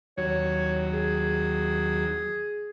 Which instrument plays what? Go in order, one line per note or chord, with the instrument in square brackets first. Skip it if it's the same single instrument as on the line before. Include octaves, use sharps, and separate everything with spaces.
[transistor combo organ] D#2 F#3 [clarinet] C#5
[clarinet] G#4